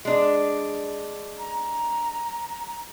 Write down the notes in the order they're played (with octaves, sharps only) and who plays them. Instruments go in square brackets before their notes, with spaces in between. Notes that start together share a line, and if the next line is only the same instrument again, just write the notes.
[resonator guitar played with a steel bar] G#3 D4
[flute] A#5